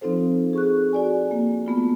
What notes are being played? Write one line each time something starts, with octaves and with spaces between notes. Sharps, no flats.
F3 C4 D#4 F4 A4 C5
G#4 C#6 F#6
F#4 D5 G#5
A#3
A3 B3 F4